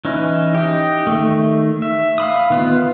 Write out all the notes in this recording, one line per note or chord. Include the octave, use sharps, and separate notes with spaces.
E3 C#4 D#4 E4
D#4 G4
D#3 A3
E5
F5 B5 D#6
D#3 B3 F4